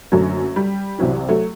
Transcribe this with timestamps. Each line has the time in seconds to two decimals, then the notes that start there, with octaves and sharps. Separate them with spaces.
0.12 F#1 F#2 D3 F#3 A3
0.56 G3
0.99 C2 C3 E3 F#3
1.29 F#3 A3